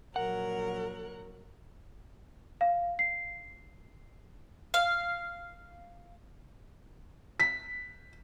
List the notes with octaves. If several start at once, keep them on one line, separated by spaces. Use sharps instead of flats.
A#1 F#3 A#4 F#5
F5
C7
F5
B6